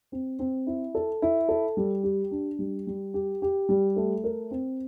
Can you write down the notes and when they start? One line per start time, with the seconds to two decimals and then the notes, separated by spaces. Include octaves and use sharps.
0.12 C4
0.39 C4
0.67 E4
0.95 A4
1.22 E4
1.49 A4
1.77 G3
2.04 G4
2.31 D4
2.59 G3
2.87 G3
3.14 G4
3.42 G4
3.69 G3
3.96 A3
4.24 A#4
4.51 C4